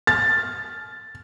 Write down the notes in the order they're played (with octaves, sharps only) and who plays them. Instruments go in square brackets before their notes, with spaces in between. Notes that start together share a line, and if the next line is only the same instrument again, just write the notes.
[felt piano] A6